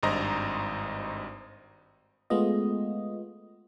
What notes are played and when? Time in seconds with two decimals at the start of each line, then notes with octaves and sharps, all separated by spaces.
0.03 G#1 G2 C5 D#5 A#5
2.30 G#3 A3 B3 F4 D#5